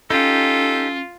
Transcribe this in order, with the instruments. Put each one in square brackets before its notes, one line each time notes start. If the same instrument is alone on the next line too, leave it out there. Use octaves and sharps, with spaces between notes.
[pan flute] C#4 [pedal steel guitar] D#4 G4 [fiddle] F4 [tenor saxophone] A4